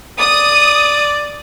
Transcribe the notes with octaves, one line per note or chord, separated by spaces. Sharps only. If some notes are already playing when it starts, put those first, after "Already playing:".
D5 D#6